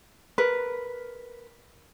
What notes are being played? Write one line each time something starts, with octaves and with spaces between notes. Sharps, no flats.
A#4 B4